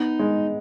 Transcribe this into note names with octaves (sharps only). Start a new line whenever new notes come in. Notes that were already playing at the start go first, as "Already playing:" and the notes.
Already playing: B3 D#4
G#3